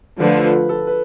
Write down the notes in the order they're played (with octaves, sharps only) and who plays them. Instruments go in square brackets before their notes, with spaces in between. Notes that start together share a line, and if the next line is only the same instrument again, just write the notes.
[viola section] D3 F3 A3 [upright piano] B4
[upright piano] B4
A4
B4